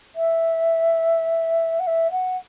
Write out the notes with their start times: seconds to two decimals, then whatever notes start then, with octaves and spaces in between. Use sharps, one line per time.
0.15 E5
1.79 F#5
1.87 E5
2.11 F#5